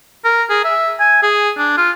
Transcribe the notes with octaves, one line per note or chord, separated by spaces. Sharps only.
A#4
G#4
E5
G#5
G#4
D4
F4